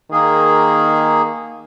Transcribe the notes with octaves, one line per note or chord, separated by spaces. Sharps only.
D#3 A#3 G#4